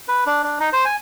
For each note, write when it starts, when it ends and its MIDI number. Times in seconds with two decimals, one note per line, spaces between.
0.08 0.24 71
0.26 0.43 62
0.44 0.59 62
0.60 0.70 63
0.73 0.85 72
0.85 0.96 80